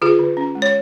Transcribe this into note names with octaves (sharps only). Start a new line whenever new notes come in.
D3 F4 G#4
D3
C#4
G#3
C#5